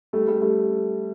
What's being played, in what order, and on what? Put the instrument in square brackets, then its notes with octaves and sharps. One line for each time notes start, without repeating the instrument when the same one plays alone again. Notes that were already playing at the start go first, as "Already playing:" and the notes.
[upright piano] G3 A3
G3 A3
G3 A3